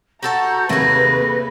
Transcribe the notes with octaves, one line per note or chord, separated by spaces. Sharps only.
F#4 A4 A5 A#5 C#6 G6
D#2 C3 A3 A#3 G#4 B4 A#6